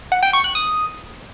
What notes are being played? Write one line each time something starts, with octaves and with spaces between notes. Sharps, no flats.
F#5
G5
C#6
F#6
D#6